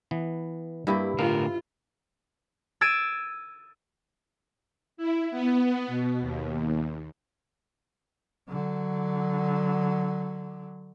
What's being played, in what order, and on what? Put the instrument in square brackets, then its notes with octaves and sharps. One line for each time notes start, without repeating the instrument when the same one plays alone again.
[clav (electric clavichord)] E3 B3
[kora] G2 E4 [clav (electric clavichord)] A#3 G4 G5
[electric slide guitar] A2 D3 A#4 [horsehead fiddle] F4 [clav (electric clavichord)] F5
[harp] E6 G#6 A6 D7 D#7
[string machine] E4
B3
B2
D#2
[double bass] D3 F#3